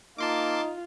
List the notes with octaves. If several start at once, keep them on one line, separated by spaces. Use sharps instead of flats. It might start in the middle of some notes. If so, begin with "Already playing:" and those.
A#3 D#4 F4 A5 C6 D6